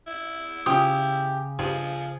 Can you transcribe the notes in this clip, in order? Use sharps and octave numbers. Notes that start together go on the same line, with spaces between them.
E4
C#3 F3 G4 G5 D#6
G2 F3 G#4 D#7